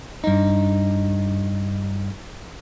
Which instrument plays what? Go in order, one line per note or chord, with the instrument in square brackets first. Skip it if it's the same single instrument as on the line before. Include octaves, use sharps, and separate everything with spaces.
[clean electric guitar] G2 D#4